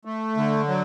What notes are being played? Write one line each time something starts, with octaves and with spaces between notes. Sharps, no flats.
A3
D3
F#3